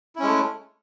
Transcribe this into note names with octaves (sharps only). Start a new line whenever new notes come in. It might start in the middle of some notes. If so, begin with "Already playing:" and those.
G#3 A3 C#4 E4